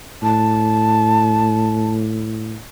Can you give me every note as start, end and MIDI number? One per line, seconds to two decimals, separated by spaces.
0.23 2.58 45
0.23 1.92 81